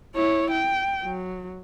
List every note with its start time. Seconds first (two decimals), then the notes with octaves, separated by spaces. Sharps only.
0.15 E4 C#5
0.51 G5
1.03 F#3